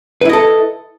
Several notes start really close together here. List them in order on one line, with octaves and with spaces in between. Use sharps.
B4 E4 D#5 A4